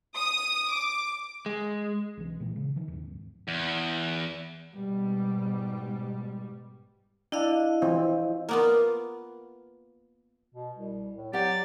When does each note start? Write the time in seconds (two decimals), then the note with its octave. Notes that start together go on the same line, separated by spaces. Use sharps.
0.15 D#6
0.70 D6
1.46 G#3
2.17 B1 E3
2.40 A#2 E3 G#3
2.56 C#3
2.76 D#3 F3
2.88 D#2 G#2
3.48 E2
4.74 G#2 B2 G3
7.32 D4 E4 D#5 F5
7.82 E3 F3 C4
8.49 A#3 B3 F4
10.55 B2
10.76 C2
11.17 A2
11.33 F#3 G4 D5 F#5